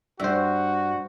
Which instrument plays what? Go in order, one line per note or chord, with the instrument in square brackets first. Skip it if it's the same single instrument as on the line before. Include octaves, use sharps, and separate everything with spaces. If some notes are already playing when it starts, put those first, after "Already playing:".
[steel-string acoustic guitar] G2 [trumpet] F#4 [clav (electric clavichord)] C5 E5